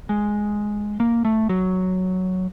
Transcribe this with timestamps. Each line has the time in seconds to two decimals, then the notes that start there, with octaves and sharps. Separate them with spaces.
0.09 G#3
1.00 A#3
1.25 A3
1.49 F#3